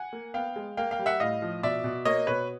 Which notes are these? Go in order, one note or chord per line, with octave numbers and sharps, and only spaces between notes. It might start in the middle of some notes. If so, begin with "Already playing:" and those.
Already playing: F#5 G#5
A#3
B3 F5 G5
G#3
A#3 F5 G5
F5 G5
G3
E5 F#5
A2 D#5 F5
F3
B2 D5 E5
B2
A#3 C#5 D#5
B2 B4 C#5